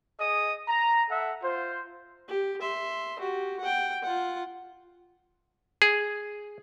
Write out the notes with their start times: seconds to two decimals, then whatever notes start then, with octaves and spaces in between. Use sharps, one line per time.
0.20 G#4 D#5 D#6
0.68 A#5
1.09 A4 E5 F#5
1.42 F4 C5
2.28 G4
2.61 E5 C6
3.19 F#4 G4
3.61 F#5 G5
4.03 F4 F#5
5.82 G#4